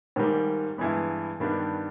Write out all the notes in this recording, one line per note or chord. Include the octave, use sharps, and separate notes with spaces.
G#2 D#3 G3 A#3
G2 E3 G#3 B3
G2 D#3 G3 B3 D4